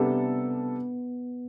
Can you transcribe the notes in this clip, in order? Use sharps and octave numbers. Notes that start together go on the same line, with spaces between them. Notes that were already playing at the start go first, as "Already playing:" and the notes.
Already playing: C3 G3 B3 D4 A4